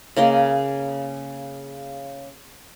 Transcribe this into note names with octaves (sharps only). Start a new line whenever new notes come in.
C#3 A#3 D#5